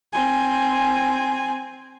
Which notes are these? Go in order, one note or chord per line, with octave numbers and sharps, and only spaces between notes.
C4 G#5